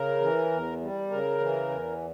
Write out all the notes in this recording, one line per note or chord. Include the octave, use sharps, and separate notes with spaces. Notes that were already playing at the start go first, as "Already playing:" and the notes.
Already playing: C#3 A#4
E3
E2
G3
C#3 A#4
E3
E2